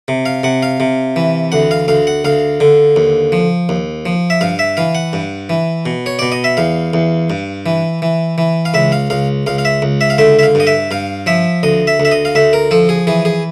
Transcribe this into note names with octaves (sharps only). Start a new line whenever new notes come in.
C3
F5
C3 F#5
F5
C3
E3
D2 F#5
F5
D2 F5
F#5
D2 F5
D3
D#2
F3
D#2
F3
E5
G2 F5
E5
E3 F5
F#5
G2
E3
B2
C#5
B2 D5
D#5
E5
E2 F5
E2
G2
E3
E3
E3
F5
C#2 E5
F5
C#2 F5
C#2 F5
F5
E5
C#2
E5
F5
D3 E5
E5
F5
G2
D#5
E5
G2 F5
F3 E5
D2 D#5
E5
D2
E5
D#5
F5
D2 E5
A#4
F3 A4
G#4
E3 G#4
G#4